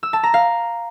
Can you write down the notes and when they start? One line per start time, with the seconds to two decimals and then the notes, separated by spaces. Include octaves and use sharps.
0.03 E6
0.13 A5
0.23 A#5
0.34 F5